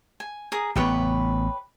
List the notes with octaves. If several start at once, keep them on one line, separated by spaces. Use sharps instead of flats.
G#5
G#4 A#4 D#6
A1 B3 G4 B4 C#5